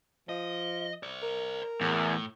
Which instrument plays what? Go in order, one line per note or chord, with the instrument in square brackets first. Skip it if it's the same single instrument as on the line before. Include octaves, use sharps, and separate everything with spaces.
[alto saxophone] F3 [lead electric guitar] D#5
[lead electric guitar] C5 D5
[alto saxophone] A#4
[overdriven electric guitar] E2 [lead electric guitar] A2